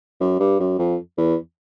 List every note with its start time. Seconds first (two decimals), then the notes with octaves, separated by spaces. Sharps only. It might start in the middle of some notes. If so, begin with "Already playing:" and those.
0.20 F#2
0.40 G2
0.60 F#2
0.79 F2
1.18 E2